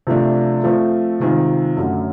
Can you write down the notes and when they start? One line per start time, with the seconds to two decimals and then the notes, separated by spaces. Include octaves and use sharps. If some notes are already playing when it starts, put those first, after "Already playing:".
0.07 C3 F3 A3 D4
0.64 F3 A3 C4
1.20 C3 D#3 G#3 C4 F4
1.77 F#2 D3 F#3 A3